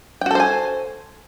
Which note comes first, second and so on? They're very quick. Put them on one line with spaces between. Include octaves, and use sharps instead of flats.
G5 F#4 A4 C5 G#5